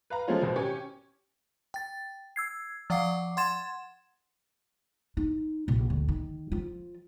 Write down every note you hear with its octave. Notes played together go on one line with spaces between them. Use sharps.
B4 F5 A#5
F3 G#3 A3 C4 C#4 F4
G#1 B2 C4 C5
C#4 G4 C#5 G#5
G5 A6
E6 G#6 C7
F3 D5 F5 F#5 D6 C7
F#5 C6 G#6 A6 E7
D#4
A#1 C3
D2
D#3
F3 F4